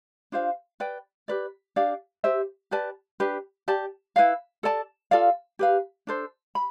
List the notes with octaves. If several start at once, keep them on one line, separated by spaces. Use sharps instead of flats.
D4 F4 C5 F5
B4 D5 G5
G4 B4 D5
D4 G4 D5 F5
G4 C5 E5
G4 B4 D5 A5
D4 G4 B4
G4 D5 A5
E4 B4 D5 F5
A4 D5 A5
F4 A4 D5 F5
G4 B4 F5
D4 A4 C5
B5